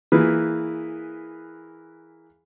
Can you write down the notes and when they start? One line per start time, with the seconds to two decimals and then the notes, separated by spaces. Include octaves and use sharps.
0.12 E3 A#3 G#4 B4